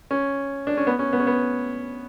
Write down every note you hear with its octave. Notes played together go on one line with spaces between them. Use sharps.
C#4
D4
C#4
B3
C#4
B3
C#4
B3